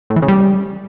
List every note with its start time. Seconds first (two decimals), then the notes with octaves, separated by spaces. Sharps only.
0.10 A2
0.16 E3
0.22 C#3
0.28 G3